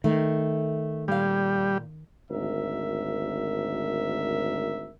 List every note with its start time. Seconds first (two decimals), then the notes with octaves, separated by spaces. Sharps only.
0.04 D#3 A3
1.08 A#2 G3 F5
2.30 G#1 D2 A#4 E5